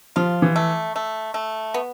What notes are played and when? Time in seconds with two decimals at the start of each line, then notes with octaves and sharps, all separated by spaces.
0.16 F3 F4
0.42 E3
0.56 A3
0.96 A3
1.34 A3
1.74 B3